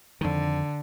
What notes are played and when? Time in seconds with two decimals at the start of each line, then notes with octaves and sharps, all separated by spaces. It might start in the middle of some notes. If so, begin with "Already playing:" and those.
0.21 F2 D3 D#3